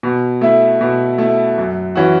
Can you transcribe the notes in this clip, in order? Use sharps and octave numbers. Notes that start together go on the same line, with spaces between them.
B2
A3 E4
B2
A3 E4
F#2
E3 C#4 F#4